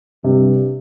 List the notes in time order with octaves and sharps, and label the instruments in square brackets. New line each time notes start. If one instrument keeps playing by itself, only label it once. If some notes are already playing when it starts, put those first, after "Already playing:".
[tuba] G2 [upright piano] C3